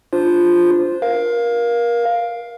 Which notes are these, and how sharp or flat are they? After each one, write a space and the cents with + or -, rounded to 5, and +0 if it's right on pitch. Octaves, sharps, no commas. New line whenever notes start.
D4 +0 F4 +0 C5 +0
A#4 +25 F5 +0